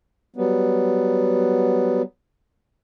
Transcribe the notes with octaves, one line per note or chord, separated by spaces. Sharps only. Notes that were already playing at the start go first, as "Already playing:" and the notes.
F#3 G3 B3